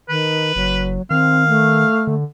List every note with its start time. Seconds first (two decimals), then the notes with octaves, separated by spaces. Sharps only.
0.09 D#3 B4
0.56 F#1 F#3
1.10 D#3 C4 F5
1.49 A3
2.07 D3